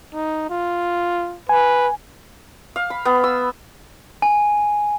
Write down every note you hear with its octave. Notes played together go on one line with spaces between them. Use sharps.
D#4
F4
B4 G#5
F5
B5
B3
E6
G#5